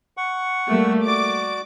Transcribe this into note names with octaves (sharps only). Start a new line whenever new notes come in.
F#5 C#6
G3 A3 A#3
F#4 D5 D6